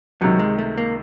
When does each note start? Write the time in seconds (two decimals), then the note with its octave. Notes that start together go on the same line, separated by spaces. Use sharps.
0.21 C#2 C3 D#3 F#3
0.39 G#3
0.59 A3
0.78 A#3